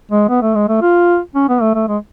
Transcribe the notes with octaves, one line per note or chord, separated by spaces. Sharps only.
G#3
B3
A3
G#3
A3
F4
C#4
B3
A3
A3
G#3